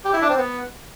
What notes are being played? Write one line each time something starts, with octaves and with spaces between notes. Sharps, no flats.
G4
E4
D4
C4
B3